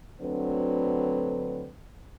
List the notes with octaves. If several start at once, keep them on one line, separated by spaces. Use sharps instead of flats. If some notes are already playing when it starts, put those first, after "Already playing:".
D2 D3 F#3 C4 B4